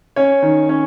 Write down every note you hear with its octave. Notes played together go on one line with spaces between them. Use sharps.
C#4 C#5
D#3
C#4